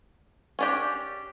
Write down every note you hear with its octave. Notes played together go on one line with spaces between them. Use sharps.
C#4 D4 G4